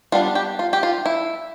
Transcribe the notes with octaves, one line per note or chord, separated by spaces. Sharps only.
G3 B3 D4 F4
G4
F4
G4
F4
E4